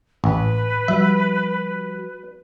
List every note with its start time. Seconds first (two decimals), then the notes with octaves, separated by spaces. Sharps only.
0.24 A1 B4
0.88 F3 G3 F#4 E5